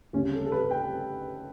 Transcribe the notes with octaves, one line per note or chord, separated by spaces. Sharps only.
D2 C#3 G3 C#4
A4
A4
B4
G5